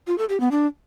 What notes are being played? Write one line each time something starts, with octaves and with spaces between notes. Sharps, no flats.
F4
A4
G4
B3
D4